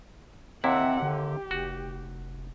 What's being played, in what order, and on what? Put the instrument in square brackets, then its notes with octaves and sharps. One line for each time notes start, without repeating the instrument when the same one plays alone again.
[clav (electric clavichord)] D#2 C3 E4 [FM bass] C4 [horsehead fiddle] E5 F#5
[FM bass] D3 [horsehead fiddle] G4
[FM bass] F1 [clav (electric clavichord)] F#4